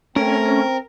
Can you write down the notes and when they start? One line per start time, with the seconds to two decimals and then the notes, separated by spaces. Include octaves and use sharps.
0.16 A3 C4 C#4 A#4